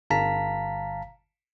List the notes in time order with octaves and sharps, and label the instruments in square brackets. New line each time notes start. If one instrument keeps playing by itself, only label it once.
[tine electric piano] G1 F5 A5 A#5 B6